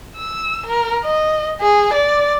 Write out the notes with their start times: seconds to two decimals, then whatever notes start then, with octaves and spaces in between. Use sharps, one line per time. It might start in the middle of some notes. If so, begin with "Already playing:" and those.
0.17 E6
0.66 A#4
1.04 D#5
1.61 G#4
1.93 D5